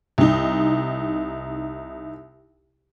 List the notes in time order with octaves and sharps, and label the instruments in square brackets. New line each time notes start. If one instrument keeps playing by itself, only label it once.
[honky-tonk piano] C2 D#4